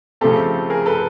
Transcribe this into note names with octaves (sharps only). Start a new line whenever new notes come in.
C#3 F3 A3 C4 G4 A4
G#4 A#4
A4 B4